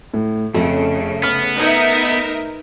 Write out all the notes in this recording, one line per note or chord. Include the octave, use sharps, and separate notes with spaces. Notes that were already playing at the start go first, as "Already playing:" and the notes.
A2
F2 C#3 A3
B3 F6
D#4 A#4 B4 E5 G#6